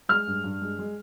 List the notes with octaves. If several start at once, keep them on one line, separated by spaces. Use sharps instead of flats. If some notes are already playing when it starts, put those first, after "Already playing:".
G#3 F6
G2
G2
G#3
G#3